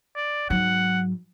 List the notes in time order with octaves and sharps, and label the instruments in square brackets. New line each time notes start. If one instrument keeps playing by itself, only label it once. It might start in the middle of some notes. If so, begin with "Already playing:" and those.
[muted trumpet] D5
[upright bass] G#2 F#3 [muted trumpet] F#5